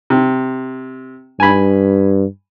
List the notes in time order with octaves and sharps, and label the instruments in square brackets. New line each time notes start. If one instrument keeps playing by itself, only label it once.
[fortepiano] C3
[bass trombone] G2 [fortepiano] G#5 B5